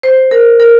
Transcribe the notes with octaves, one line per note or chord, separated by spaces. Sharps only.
C5
A#4
A#4